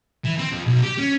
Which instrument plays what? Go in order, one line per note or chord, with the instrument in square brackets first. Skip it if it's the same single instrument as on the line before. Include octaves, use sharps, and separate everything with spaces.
[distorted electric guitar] E3
C4
F2
B1
G4
C#4